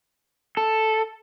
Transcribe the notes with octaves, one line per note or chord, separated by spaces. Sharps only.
A4